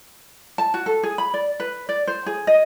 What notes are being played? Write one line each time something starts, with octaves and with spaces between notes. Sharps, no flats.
A5
F#4
A4
G#4
B5
D5
B4
D5
C5
G#4
D#5